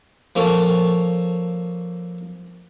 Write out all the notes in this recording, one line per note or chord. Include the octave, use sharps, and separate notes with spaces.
F3 A#3 C#4 A4 C#5